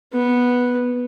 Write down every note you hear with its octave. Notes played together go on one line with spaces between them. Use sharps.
B3